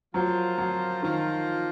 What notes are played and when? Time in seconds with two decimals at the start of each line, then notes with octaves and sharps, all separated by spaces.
0.14 F3 F#3 A#3 F4 C5
0.58 F#3
1.03 D#3 F3 A#3 F4 C5